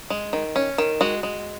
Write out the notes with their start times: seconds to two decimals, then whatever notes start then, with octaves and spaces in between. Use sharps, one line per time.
0.10 G#3
0.33 D#3
0.56 C#4
0.78 D#3
1.01 G#3 F#4
1.23 G#3